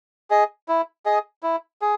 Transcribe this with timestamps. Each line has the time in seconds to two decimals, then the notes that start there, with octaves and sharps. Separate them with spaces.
0.31 G#4 D#5
0.68 E4
1.06 G#4 D#5
1.43 E4
1.82 G#4